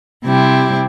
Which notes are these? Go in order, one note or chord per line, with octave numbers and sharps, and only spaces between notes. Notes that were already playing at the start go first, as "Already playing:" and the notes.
C3 G3 C4 E4 G4